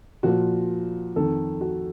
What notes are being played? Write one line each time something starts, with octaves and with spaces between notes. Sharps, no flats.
A#2 F3 F#4
F2 D#3 A4
F#4